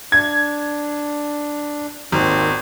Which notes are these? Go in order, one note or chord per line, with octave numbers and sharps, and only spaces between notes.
D4 G#6
G#1 D#2 D#3 C4